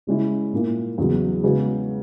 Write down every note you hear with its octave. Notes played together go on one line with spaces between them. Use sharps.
C#3 G#3 C#4 E4
A#2 A#3 E4
E2 C#3 F#3
C#3 G#3 B3 F#4